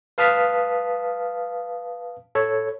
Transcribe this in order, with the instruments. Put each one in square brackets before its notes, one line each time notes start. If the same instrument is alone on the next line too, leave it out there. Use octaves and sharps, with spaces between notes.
[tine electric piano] B4 F5 A5 D#6 F6 B6
A4 C#5